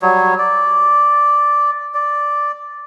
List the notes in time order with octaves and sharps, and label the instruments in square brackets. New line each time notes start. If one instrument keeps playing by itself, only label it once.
[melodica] F#3 G3 C#5
D5
D5